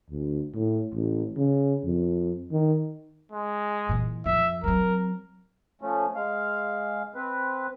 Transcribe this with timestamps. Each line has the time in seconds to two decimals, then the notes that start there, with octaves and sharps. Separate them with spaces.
0.11 D2
0.54 A2
0.94 A1
1.37 C#3
1.85 F2
2.52 D#3
3.32 G#3
3.89 A#2 E3
4.26 F2 E5
4.64 F#3 C4 A#4
5.82 F3 A3 C#4
6.15 G#3 F5
7.15 C4 B4